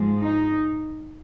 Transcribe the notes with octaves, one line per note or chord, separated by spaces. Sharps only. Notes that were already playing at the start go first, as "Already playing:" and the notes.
Already playing: G#2 F3 G#3
D#4